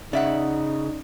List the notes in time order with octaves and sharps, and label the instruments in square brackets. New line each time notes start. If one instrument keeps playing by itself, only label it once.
[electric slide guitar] C#3 [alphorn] D#4 [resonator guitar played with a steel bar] D5 E5 F#5